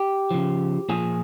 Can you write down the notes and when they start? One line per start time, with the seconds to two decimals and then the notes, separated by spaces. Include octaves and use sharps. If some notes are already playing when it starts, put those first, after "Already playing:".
Already playing: G4
0.31 C#3 F3
0.89 A#2 F3 G#4